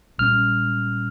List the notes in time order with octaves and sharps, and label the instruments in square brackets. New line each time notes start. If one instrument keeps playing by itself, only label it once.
[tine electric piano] A#1 A#2 G3 C#4 F6